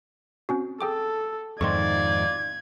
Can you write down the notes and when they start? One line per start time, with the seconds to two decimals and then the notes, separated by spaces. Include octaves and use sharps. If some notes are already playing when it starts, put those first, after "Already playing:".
0.49 C4 C#4 F#4
0.81 G#4 A4 G5 D6
1.61 F2 G#2 D#3 F4 D5 C6 C#6 G#6